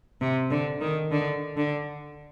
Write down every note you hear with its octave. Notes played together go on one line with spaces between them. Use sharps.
C3
D3
D#3
D3
D3